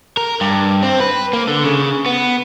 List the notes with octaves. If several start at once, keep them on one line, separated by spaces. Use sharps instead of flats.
A#4
G2
C4
B4
A#3
D3
C#3
B3